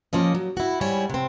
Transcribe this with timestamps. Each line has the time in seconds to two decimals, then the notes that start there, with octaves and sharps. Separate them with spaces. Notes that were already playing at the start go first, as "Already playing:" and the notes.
0.13 F3 A#3 C#4 D#5
0.35 F#3
0.57 E4 F#4
0.81 G#2 G3 E4 C#5 G#5
1.10 C3 C4